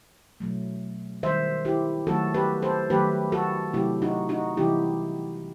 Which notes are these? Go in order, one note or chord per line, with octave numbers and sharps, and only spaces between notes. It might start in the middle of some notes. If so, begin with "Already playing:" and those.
B2 F#3 A3
D#3 G3 C5 E5
E4 G4
D#3 F#3 A3 F#4 A4
G4 B4
A4 C5
D#3 F#3 A3 G4 B4
F#4 A4
C3 F#3 A3 E4 G4
D#4 F#4
D#4 F#4
C3 E3 G3 E4 G4